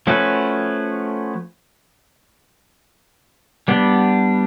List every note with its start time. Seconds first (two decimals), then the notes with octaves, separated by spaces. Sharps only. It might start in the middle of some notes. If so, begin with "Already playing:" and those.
0.07 F3 A3 C#4 F#4 B4
3.68 G3 B3 D4